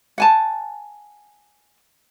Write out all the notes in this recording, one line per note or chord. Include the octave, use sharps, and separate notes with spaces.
F#5 G#5 A5